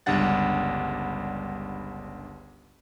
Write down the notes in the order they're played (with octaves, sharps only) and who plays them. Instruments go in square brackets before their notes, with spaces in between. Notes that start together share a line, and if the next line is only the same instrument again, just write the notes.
[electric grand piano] G1 C#2 G3 D4 F#5 A6